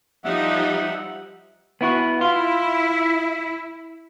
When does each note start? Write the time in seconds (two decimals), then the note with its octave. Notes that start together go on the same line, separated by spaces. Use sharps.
0.24 F3 G3 D#4 E5 F#5
1.81 B3 E4 F#4
2.21 E4 F4